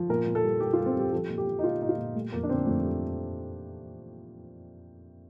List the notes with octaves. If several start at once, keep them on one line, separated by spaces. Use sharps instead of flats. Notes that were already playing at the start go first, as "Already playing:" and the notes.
Already playing: F3
A#2 A#4
A#2
A4
G3
G3 G4
F4
G3
C4
G3 G4
F3 A4
A#2
G4
A#2
D#4
A#2 F4
A#2 D#4
F4
A#2
G3 A3
F2 A#3
D4
D3 C4
F2 A3
G3